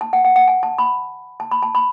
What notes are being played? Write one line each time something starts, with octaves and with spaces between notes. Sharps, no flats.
A5
F#5
F#5
F#5
G#5
A5
B5
A5
B5
A5
B5